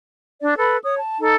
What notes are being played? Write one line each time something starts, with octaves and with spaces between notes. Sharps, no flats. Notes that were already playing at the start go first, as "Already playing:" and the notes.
D4 D5
A4 B4 B5
C#5 D#6
A5
D#4 A4